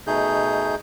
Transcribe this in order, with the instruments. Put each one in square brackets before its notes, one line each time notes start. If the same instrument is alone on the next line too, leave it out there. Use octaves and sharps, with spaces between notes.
[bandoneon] B2 A3 D#4 G#4 G6